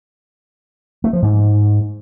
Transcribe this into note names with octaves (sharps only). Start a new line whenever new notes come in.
A3
F3
G#2